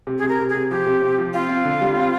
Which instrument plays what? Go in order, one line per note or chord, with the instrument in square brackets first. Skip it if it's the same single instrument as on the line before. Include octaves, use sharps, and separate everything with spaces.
[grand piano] C3
[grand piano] C3 [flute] G#4
[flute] A#4
[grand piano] C3
[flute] G#4
[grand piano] C3
[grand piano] F3 [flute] G4
[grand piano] C3
C4
F3
[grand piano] C4 [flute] F4
[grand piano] C4
D3
G3
C4